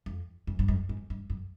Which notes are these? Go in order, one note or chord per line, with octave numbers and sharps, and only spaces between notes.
F2
F#2
G2
F#2
G#2
G2
F#2